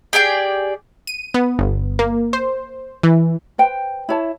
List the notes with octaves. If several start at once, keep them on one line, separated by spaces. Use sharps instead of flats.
G4 G#4 D5 G5
D#7
B3
G1
A#3
C5
E3
B4 C5 G5
E4 C#5 A5